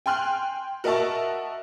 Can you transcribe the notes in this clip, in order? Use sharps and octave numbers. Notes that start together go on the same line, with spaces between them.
G5 G#5 C6 F6 F#6
F#4 A#4 D#5 E5 A5 C#6